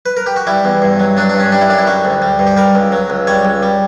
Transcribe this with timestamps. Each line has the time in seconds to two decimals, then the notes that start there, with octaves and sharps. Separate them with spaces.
0.06 B4
0.17 A#4
0.26 G4
0.36 F#4
0.47 G3 E4
0.65 E2
0.82 G2
0.99 F#3
1.17 F#3 D4
1.29 G2 D4
1.40 C#4
1.52 G3 D4
1.61 E4
1.69 F#2 D4
1.78 E4
1.87 G3 F#4
2.05 D2
2.22 G3
2.39 G2
2.47 G4
2.57 G3 A#4
2.75 C#2
2.92 F#3
3.10 C#2
3.27 G3 C#5
3.45 C#2
3.63 G3